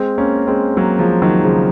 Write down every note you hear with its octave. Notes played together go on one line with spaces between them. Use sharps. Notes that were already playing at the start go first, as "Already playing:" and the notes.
Already playing: G#3 C4
A#3 C#4
G#3 C4
F#3 A#3
F3 G#3
D#3 F#3
C#3 F3